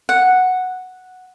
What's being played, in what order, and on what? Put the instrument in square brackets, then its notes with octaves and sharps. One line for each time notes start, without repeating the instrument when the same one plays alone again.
[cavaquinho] F#5